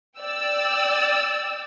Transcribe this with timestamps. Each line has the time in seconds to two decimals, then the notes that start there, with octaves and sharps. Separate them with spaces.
0.19 D5 G5 E6